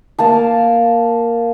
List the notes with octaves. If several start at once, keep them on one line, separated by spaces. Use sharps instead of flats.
A#3 F5 A5